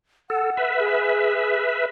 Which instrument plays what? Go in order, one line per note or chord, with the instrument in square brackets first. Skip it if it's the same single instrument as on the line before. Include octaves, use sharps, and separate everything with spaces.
[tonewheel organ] A4 [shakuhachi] F#5
[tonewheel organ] B4 E5
[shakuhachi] G#4